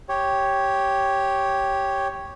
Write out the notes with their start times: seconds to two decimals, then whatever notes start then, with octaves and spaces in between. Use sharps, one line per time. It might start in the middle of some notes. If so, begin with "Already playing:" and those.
0.09 G4 C#5